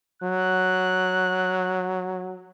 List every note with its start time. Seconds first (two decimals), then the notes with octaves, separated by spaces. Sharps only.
0.22 F#3 F#6